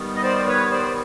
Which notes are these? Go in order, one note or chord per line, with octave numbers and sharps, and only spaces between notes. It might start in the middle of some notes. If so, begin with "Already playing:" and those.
Already playing: D#3 G3 B3
D#5
C5 D5
B4 C#5
C5 D5